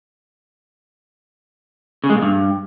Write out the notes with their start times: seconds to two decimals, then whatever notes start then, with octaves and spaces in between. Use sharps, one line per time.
2.04 C#3
2.10 G#3
2.16 A#2
2.22 G2